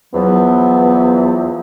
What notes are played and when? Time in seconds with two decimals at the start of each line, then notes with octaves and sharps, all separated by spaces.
0.14 E2 F3 F#3 B3